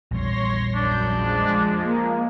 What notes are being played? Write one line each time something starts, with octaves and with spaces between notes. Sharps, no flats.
A#1 E2 G3 C#5 C6 A#6
F#2 D4 G6
F3 G#3
A#3